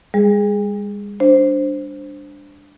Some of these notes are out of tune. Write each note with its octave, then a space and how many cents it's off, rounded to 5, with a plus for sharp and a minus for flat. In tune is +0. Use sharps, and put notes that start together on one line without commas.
G#3 -45 G#4 +0
D4 +0 C5 +0